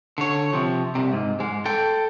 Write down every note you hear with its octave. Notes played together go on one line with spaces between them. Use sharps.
D3 C#5
C3 F3
C2 C3
G#2
G#2 G#3
A4 G5